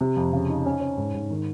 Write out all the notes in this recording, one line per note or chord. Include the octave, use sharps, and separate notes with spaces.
C3
F2
C#3
D#4
C#4
C#4
G#2
G#2
D#3